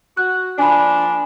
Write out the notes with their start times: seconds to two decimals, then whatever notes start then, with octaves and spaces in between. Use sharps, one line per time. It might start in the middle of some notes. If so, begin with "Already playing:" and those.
0.17 F#4 F#6
0.59 F3 A#3 D4 G#5 B5